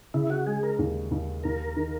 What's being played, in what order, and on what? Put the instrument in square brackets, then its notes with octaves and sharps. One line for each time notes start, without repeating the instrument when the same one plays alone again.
[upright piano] C#3 [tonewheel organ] E4
[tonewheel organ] F#4
[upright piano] G#3 [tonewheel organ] G#4
[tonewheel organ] A#4
[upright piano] D#2
D#2
[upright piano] D#2 [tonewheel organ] A#4
[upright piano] D#3